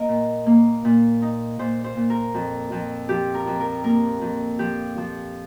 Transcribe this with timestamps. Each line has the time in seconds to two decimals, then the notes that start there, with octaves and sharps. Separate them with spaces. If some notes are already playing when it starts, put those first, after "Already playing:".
Already playing: A#3 A#4 D#5
0.09 A#2
0.46 A#3
0.85 A#2
1.22 D#4
1.59 A#2 C5
1.84 C5
1.97 A#2
2.10 A#4
2.34 F2
2.72 F2
3.09 F3 G4
3.34 A#4
3.47 F2
3.60 A#4
3.84 A#3 A#4
4.21 F2
4.59 F3 G4
4.97 F3